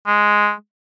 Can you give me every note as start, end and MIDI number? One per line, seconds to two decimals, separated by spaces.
0.07 0.51 56